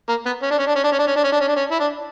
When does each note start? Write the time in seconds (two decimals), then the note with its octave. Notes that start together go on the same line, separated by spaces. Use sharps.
0.09 A#3
0.26 B3
0.42 C#4
0.51 D4
0.58 C#4
0.67 D4
0.76 C#4
0.84 D4
0.92 C#4
0.99 D4
1.07 C#4
1.16 D4
1.24 C#4
1.32 D4
1.40 C#4
1.48 D4
1.56 C#4
1.71 E4
1.79 D4